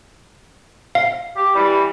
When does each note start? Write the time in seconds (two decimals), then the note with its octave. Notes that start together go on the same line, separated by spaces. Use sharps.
0.95 F5
1.36 G4
1.54 E3 G3